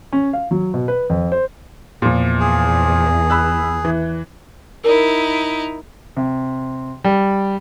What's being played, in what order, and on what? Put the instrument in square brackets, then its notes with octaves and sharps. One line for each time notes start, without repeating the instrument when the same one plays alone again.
[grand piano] C#4
F5
F#3
B2
B4
F2
C5
[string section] E2 [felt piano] A#2 F3
[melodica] G#4
[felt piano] B5 E6 F#6
E3
[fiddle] D#4 E4 [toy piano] A#4
[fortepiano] C3
G3